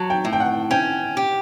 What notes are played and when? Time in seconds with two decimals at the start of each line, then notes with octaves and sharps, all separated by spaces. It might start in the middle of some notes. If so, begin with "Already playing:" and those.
Already playing: F#3 A5
0.10 G5
0.25 A2
0.33 G5
0.40 F#5
0.71 C#4 G5
1.17 G4